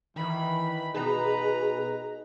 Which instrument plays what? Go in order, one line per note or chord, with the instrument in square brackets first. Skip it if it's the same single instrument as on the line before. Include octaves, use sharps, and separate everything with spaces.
[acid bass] D#3 [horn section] E3 [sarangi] B5
[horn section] B2 B4 [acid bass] D#4 [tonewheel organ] G#4 [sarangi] A#5